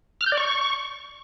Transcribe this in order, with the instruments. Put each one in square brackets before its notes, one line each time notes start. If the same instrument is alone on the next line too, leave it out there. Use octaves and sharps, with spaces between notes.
[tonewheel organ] F6
G6
D5
C#6